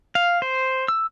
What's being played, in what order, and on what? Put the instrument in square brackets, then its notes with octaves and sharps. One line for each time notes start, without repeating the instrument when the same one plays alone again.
[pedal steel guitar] F5
C5
E6